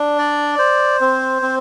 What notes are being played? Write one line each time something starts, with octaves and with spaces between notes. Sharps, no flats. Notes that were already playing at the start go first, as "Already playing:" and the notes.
Already playing: D4
D5
C5
C4
C4